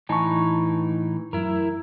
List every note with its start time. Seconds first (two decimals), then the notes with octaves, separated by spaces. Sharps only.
0.09 A2 E3 D#4 G#5 A5 C#6
1.33 F#2 F#3 E4 A#4